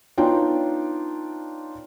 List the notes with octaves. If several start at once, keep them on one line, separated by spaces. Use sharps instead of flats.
B3 D4 D#4 F4 C#5 G5